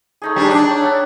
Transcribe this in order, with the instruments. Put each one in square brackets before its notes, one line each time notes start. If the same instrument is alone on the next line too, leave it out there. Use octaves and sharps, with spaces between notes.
[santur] A3 D#4 G#4
[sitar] G3 D4 [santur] A#5
[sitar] D4
[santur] C#5 G5
E5 F#5 A5